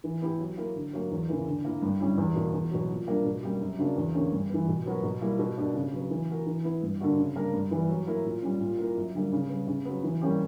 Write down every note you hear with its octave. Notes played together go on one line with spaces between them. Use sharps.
E3
B3 E4 G4
F#3
A#3 E4 A#4
D3
F#3 A#3
E2
C#3 E3 A#3
D3
A#3 E4 A#4
G2
D3 G3 C#4 E4
E2
B2 A#3
E2
B2 F#3
A#2
G3 A#3 D4 A#4
B2
G3 A#3 C#4 G4
F#2
C#3 F#3 A#3 D4
E2
D3 A#3 C#4 G4
G2
E3 B3
B2
F#3 B3 F#4 A#4
B2
G3 A#3 E4
B2
A#3 D4 G4
C#3
F#3 B3
E3
B3 F#4 A#4
E3
B3 E4
G2
D3 A#3 D4 F#4
C#3
G3 A#3 D4 A#4
G2
E3 G3 B3
F#3
A#3 E4 A#4
A#2
G3 C#4
A#2
A#3 E4 A#4
F#2
D3 G3 A#3
C#3
G3 B3
C#3
F#3 B3
E3
G3 A#3 C#4 G4